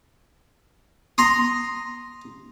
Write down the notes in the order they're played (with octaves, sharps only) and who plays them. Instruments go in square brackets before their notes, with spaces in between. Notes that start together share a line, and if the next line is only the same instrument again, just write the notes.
[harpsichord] A#5 C6 D#6